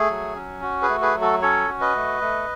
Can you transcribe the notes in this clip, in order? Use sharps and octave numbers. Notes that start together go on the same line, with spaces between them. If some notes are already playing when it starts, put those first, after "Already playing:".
Already playing: A3 G#4
F#3
C#4
F#4
G#4 B4
A3
G#4 B4
F#3
F#4 A4
C#4 A4 C#5
F#4
B4 D#5
A3
A3